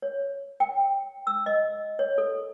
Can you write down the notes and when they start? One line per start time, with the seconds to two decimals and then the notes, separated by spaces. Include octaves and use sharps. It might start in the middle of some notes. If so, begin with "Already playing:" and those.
0.02 C#5
0.60 G5
1.27 E6
1.46 D#5
1.99 C#5
2.18 A4